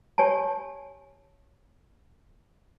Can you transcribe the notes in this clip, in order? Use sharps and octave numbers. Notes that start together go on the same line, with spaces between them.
G4 C#5 G#5 A5